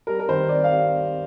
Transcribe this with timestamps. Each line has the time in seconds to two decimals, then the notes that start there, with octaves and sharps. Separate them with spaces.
0.07 G3 A#4
0.19 A#4
0.29 D#3 C5
0.49 G3 D5
0.64 F5
0.71 G3